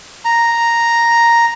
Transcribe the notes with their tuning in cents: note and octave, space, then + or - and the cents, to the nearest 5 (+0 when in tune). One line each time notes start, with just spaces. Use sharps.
A#5 +0